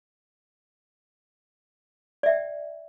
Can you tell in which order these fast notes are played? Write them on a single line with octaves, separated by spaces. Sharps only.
D5 E5 G5